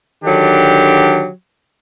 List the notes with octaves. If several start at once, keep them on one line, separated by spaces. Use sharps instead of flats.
D3 D#3 F#3 D4 G4